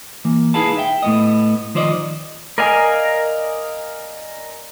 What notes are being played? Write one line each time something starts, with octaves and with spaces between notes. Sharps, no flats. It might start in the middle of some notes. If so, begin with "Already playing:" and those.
E3 A#3
D#4 E4 G#4 B4 F5 A5
E5 G5
A2 B3 D#5
D#3 F3 C5 D5 D#5
A#4 D5 D#5 F5 G#5